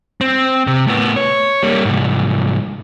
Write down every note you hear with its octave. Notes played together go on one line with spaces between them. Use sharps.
C4
C3
A2 B3
C#5
G3 A#3
C2 G#2